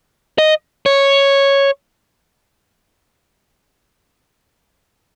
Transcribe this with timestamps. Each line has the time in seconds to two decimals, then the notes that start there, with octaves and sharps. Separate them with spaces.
0.38 D#5
0.86 C#5